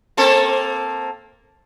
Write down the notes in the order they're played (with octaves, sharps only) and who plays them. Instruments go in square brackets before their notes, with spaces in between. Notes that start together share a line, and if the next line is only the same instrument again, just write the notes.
[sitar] A#3 C4 A4